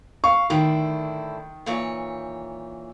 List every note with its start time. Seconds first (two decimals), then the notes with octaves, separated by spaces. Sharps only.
0.24 F5 C#6
0.50 A2 D3 D#3 E4
1.66 A#2 E3 C#5